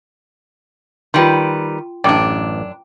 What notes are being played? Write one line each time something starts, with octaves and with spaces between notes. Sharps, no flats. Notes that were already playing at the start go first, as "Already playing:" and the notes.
D#3 G3 F4 B4 G5 C6
A1 F#2 D4 D5 G5 D6